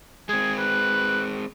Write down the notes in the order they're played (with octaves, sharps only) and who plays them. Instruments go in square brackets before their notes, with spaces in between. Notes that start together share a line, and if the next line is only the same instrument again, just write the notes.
[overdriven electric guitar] G#3 C4 [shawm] G#4
[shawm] B4